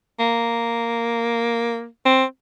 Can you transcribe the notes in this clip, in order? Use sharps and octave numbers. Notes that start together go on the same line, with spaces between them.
A#3
C4